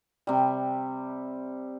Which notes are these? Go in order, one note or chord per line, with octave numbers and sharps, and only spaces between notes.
C3 G3